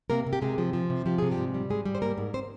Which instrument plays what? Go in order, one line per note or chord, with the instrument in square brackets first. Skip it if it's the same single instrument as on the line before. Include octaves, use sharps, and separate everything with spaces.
[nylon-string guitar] C3 A#3 A#4
C3
G4
C3 G#3 G#4
F3
F3
C3
F3 G4
C3 G#4
G3 G4
G#2
G3
G#2 G#3 G#4
G3
C5
G#2 A#3 A#4
G#2
C4 C5